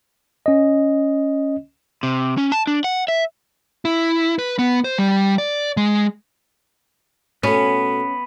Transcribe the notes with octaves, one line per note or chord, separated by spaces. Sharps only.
C#4 D#5
C3
C#4
A5
D4
F#5
E5
E4
B4
B3
C5
G3
D5
G#3
B2 A3 B3 C#4